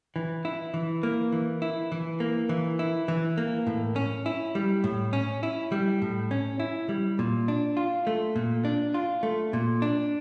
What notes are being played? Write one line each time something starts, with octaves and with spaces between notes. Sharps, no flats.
E3
E4
E3
A#3
E3
E4
E3
A#3
E3
E4
E3
A#3
A2
C#4
E4
G3
A2
C#4
E4
G3
A2
C#4
E4
G3
A#2
D4
F4
A3
A#2
D4
F4
A3
A#2
D4